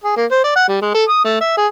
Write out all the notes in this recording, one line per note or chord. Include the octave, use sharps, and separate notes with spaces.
G#4
A#3
C5
D5
F#5
G3
G#3
A4
D#6
A3
E5
G#4